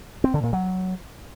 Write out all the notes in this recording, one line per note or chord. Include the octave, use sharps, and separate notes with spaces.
C4
D3
A#2
F#3